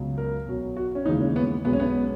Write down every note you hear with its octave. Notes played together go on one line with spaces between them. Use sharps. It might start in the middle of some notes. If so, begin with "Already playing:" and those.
Already playing: C#2 B2 F#3
A#4
B1 B2 F#3
F#4
C#4
D#2 C#3 E3 G#3 D#4
C#4
B3
B1 B2 G#3 B3
C#4
B3